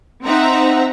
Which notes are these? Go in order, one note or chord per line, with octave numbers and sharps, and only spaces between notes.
C4 D#4 E5 F#5 A#5